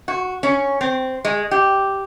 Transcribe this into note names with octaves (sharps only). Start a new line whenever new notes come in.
F#4
C#4
C4
G#3
G4